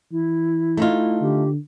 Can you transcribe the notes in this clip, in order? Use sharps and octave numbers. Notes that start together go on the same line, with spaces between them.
E3 E4
A3 D#4 F4
D3 G4